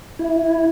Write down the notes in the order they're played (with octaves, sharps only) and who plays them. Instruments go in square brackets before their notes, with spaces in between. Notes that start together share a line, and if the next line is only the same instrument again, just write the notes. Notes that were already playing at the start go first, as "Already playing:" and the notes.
[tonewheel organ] E4